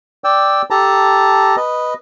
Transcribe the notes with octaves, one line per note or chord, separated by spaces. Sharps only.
D5 G5 E6
G4 A4 A5 A#5
B4 D#5